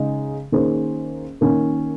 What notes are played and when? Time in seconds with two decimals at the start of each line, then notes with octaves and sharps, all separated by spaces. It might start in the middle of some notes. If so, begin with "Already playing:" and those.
Already playing: C#3 G#3 D#4
0.52 D#3 A#3 C#4 G#4 C5
1.41 D#3 A#3 C#4